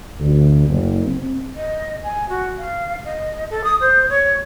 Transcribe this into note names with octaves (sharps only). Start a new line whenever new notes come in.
D2
F#1
C4
D#5
G#5
F#4
F5
D#5
A4
D#6
C5
C#5